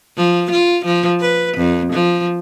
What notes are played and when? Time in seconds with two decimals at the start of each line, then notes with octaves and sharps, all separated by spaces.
0.17 F3
0.51 F4
0.85 F3
1.21 B4
1.58 F2
1.93 F3